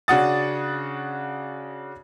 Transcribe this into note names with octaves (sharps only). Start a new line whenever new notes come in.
C#3 D4 F#4 F#5 D#6 A6